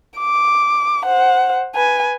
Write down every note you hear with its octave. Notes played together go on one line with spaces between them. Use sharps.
D6
C5 F#5
B4 G#5